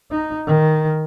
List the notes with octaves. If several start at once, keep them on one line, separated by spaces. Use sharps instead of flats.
D#4
D#3